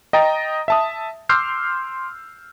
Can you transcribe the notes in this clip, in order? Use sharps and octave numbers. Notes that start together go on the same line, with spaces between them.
D#5 G5 A#5 A6 A#6
E5 A5 D#6
C6 D6 E6 F6 G6 C7